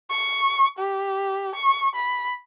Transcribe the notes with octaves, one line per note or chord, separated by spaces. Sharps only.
C#6
G4
C#6
B5